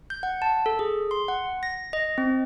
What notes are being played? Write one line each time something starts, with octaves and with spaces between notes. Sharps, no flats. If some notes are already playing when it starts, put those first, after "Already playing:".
G6
F#5
A5
A4
G#4
C6
F#5
A#6
D#5
C4